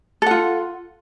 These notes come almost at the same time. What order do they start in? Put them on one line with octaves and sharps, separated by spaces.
A4 F#5 F4